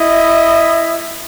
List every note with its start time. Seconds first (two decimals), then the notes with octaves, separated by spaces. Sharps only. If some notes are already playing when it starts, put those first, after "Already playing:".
Already playing: E4 D#5